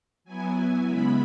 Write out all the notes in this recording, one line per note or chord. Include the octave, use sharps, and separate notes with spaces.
F#3 B3 E4 G#5
C#3 G#3 B3 E4 B5